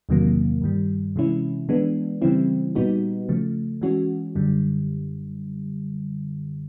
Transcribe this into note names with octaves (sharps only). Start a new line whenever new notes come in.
E2 C3 D#3 F#3 A#3
G2 D#3 G3
C3 E3 G#3 C#4 E4
E3 G#3 B3 D4
C#3 E3 G3 C4 E4
A#2 G3 B3 D#4 F#4
C#3 F3 A3
E3 G#3 C#4 F#4
F#2 D3 G3